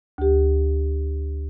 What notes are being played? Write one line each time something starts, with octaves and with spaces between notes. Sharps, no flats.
D2 G4